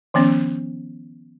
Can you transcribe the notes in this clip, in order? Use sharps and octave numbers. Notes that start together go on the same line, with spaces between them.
D#3 F3 B3 C#4